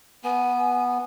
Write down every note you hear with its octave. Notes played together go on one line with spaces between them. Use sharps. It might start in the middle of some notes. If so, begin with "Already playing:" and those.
B3 G#5